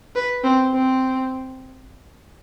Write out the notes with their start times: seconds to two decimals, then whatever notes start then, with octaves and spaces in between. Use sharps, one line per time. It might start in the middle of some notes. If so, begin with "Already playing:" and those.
0.16 B4
0.44 C4
0.74 C4